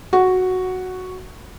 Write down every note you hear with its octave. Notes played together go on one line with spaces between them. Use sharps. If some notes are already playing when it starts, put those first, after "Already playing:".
F#4